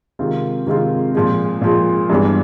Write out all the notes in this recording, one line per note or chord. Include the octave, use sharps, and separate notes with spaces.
C3 D#3 G#3 C4 F4
C3 D#3 G#3 C4 F4
A#2 F3 G#3
A#2 F3 G#3
G2 E3 G#3 B3 D4